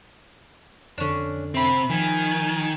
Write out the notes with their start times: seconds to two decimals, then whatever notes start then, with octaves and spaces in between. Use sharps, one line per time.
0.98 F2 D3 C#4 D4
1.54 C3 C4 E5 B5
1.90 D#3 F3 G#5 B6